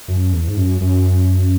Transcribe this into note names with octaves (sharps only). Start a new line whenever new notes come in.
F#2
E2
G#2
F#2
F#2